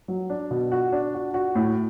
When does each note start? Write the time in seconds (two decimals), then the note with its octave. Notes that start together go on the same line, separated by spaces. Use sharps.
0.08 F#3
0.29 D4
0.51 B2
0.72 F#4
0.92 D4
1.14 F#4
1.34 F#4
1.55 A2